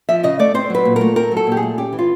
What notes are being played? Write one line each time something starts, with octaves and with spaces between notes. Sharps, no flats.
F3 E5
C#3 D#5
A3 D5
C4 C5
F#3 B4
A#2
A3 A#4
C4 A#4
F#3
A4
A#2 G4
G#4
A3
C#4 G4
E3
F4